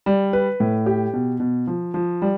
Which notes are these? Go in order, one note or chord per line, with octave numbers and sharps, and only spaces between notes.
G3
B4
A2
G4
B2
B2
F3
F3
G3